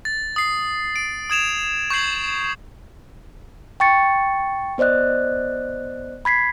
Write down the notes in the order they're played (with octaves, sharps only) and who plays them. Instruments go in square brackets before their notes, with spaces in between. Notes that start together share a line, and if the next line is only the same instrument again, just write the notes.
[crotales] A6
D#6 C7
D7
D#6 G#6 E7 F7
C#6 G6 G#6 C7 F#7
[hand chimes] G5 C#6 A6 C#7
B3 C5 D5 D#5 F#6
B5 G#6 B6 C7